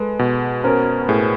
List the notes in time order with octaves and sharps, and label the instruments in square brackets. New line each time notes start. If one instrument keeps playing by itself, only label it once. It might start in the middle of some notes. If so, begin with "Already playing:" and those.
Already playing: [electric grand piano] G#3 [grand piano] A4 B4
[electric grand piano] B2
[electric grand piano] C#4 [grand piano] A#4 C5
[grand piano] B4
[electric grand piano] A2 [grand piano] G#4 A#4